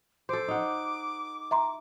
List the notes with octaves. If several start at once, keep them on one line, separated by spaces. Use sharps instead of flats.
A4 C5 D6
D#4 F#5
E5 A#5 C6